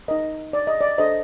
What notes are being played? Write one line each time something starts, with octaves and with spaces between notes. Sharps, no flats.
D#4 A#4 D#5
D5
D#5
D5
D4 A4 C5 D#5